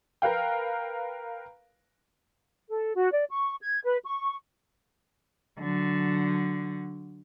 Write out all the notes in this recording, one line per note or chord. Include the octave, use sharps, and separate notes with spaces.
A#4 B4 F5 G5
A4
F#4
D5
C#6
G#6
B4
C#6
D3 F#3